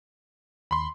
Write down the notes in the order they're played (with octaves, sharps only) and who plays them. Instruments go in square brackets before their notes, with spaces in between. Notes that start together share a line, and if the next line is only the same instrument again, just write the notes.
[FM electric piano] D#2 [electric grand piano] B5 C6